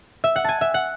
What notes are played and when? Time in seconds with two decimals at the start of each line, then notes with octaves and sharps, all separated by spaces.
0.24 E5
0.36 F#5
0.44 G#5 A5
0.61 E5
0.74 F#5